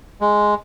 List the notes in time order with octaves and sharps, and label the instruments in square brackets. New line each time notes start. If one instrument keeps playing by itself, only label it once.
[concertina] G#3